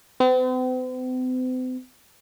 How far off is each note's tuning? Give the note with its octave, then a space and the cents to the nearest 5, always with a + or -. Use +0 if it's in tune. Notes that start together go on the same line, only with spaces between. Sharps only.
C4 -45